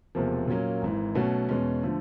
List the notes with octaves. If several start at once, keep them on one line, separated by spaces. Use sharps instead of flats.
E1 E2 C3 F3 A#3
A#2 F#3 A#3 C#4
G#1 G#2 E3
B2 F#3 A3 C#4 F#4
E2 B2 G#3 C#4
D3 F3 A3